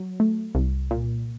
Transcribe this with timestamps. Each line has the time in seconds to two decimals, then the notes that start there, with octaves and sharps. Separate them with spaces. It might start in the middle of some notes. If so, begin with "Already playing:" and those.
Already playing: F#3
0.20 A3
0.55 C2
0.91 A#2